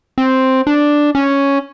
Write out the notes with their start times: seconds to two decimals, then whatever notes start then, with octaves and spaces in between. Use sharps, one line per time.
0.18 C4
0.67 D4
1.15 C#4